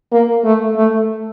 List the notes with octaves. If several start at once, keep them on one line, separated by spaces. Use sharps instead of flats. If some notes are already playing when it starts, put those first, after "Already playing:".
A#3
A3
A3